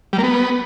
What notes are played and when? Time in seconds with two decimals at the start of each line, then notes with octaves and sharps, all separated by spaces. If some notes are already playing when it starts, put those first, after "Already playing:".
0.13 G3
0.18 A#3
0.24 B3